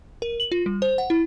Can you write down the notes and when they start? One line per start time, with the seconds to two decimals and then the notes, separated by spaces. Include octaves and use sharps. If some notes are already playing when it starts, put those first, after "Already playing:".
0.22 A#4
0.40 F#7
0.52 F4
0.66 G3
0.82 C5
0.98 F#5
1.10 E4